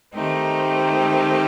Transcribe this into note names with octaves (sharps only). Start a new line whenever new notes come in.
D#3 A3 C4 D#4 G4